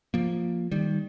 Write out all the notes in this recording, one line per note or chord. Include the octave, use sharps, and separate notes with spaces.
F3 A#3
D#3 G3